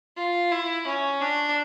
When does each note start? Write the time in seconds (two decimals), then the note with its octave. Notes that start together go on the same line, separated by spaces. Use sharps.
0.17 F4
0.51 E4
0.86 C#4
1.21 D4